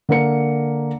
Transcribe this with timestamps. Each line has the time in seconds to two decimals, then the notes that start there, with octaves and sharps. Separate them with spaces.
0.09 D3 A#3 A#4 C#7